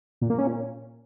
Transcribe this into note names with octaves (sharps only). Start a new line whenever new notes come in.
A#2
A#3
C#4
A#2